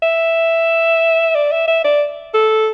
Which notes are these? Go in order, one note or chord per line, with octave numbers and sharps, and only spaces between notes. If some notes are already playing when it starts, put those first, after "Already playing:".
E5
D5
E5
E5
D5
A4